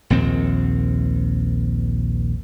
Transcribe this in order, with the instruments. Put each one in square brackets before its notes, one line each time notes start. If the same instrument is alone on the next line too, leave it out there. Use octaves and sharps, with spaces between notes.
[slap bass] A#1 D#2 C4